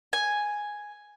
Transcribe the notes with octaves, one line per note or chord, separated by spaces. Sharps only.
G#5